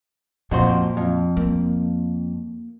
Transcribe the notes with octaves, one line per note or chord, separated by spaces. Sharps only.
F2 A#2 F#4 C5
F2
A#3